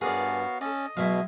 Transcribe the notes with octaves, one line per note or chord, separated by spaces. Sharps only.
G2 B3 F#4 G#4 A#4 C#5 D5 F5
C#4 A4 D5 D#5
B2 F#3 G#3 E4 E5 F5